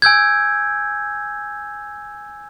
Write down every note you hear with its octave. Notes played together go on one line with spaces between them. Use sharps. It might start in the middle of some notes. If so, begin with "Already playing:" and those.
G#5 E6 G6 G#6